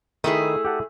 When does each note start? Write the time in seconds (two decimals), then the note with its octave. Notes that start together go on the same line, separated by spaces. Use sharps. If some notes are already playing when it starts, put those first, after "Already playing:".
0.24 D#3 A3 E4 G#4
0.65 G4 F#5 A5